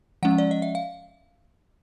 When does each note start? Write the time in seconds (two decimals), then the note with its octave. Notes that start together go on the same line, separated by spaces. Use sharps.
0.23 F3 G#3 C#4 F#5
0.38 D5
0.51 D#5
0.62 E5
0.75 F5